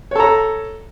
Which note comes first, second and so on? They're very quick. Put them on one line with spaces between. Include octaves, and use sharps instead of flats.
C#5 A4 A#5